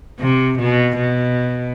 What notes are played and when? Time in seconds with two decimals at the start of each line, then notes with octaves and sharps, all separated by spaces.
0.20 C3
0.59 B2
0.97 B2